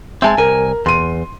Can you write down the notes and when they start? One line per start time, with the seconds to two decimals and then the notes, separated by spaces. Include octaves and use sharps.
0.22 G#3 C4 E5 G#5 A5
0.38 C2 A#4 G#5
0.86 E2 C6 D#7